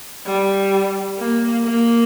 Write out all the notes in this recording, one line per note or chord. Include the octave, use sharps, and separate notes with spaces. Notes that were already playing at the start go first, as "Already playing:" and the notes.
G3
A#3
A#3